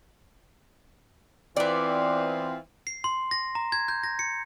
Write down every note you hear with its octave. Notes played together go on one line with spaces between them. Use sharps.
E3 B3 C4 F4 D5
C7
C6
A#6
A#5
G#6
G6
A#6
C#7